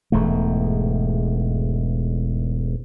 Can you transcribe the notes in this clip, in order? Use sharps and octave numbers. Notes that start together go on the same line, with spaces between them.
E1 E2 G#2 A3